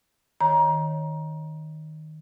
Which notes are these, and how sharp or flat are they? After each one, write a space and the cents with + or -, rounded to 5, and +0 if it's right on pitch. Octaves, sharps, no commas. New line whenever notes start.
D#3 +0 C#5 +0 A#5 +25